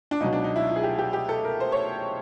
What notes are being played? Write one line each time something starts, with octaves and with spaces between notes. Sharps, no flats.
D4
C#2 B2 F#3 D#4
D4
D#4
E4
F4
G#4
G4
G4
G4
A4
A#4
C5
C#5